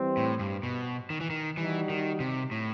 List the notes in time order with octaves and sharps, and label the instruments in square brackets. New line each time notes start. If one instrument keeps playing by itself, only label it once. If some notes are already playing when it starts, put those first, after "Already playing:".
Already playing: [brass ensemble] E3 G3 C4
[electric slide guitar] A2
G2
B2
D#3
E3
D#3
[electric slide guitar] E3 [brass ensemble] G3 D#4 F#4
[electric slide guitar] D#3
C3
A2